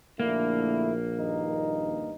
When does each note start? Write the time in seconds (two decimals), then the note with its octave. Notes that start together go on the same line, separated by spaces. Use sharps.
0.20 A#1 D3 A3 A#3 E4
1.18 G2 D#3 D#4